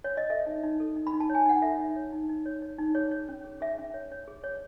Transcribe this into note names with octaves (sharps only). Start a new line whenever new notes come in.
C#5
D#5
A4 E5
D#4
D#4
A4
D#4
B5
D#4
A5
C#5
G#5
D#4 F#5
A4 E5
D#4
C#5
D#4
D#4
C#5
C#5
D#4
G#4 C#5
C#5
C#4
G#4
G#4 E5
C#4
C#5
C#5
G#4
C#5